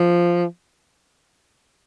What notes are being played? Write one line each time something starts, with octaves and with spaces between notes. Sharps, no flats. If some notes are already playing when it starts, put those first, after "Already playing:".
Already playing: F3